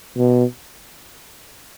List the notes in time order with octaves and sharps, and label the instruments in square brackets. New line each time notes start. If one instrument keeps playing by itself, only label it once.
[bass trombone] B2